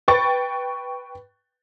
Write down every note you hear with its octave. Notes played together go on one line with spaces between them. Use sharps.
B4 G5 C#6 A6